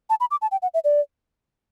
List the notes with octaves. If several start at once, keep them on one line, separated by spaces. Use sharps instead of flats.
A5
B5
D6
A5
G5
F#5
E5
D5